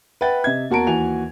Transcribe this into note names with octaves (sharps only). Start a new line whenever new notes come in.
B4 E5 F#5 G5 A6
C3 D#5 E5 G#6
E2 A#3 F#4 A5 A#5 D7
D#2 E3 F#4 G#5 F7